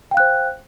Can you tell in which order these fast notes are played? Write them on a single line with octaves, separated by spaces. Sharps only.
G5 F5 F#6 C5